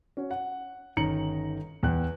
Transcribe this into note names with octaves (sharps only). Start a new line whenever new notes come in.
C#4 F#4
F#5
G1 D#3 C#4 A#5 C#7 F#7
E2 G5 F#6